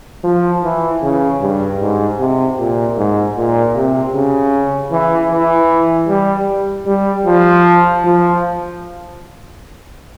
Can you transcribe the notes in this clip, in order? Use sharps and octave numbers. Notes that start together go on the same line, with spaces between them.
F3
E3
C#3
G2
G#2
C3
A#2
G#2
A#2
C3
C#3
E3
E3
G3
G3
F3
F3